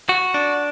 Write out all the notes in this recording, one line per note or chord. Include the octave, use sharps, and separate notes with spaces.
F#4
D4